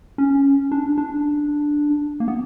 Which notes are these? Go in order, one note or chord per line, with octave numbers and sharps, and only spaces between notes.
C#4
D4
D4
A#3
B3